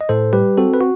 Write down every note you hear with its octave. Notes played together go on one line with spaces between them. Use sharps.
D#5
A2 A4 C5
G3 G4 B4
C4 F#4 A4
B4
F#4